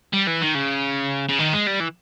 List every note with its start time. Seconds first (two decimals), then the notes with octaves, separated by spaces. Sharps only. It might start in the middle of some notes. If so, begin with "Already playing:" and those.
0.13 G3
0.27 E3
0.42 D#3
0.55 C#3
1.29 C#3
1.39 D#3
1.53 G#3
1.67 G3
1.80 E3